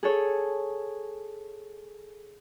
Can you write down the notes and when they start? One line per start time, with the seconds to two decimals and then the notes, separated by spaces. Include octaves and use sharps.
0.03 G#4 A4 C#5